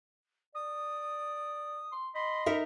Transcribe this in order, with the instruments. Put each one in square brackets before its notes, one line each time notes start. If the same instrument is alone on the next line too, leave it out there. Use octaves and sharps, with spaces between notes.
[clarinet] D5 [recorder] D#6
[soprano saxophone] C6
[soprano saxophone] D#5 [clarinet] B5 [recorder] C6
[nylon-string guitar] D#4 A#4 E5 [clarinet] B5